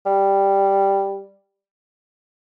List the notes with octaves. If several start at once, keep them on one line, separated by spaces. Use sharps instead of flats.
G3